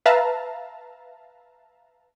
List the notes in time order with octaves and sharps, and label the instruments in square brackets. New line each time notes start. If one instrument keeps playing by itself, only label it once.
[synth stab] B4 E5 F5 A5 A#5